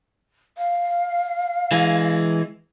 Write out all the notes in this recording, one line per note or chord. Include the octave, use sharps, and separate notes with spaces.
F5
E3 G#3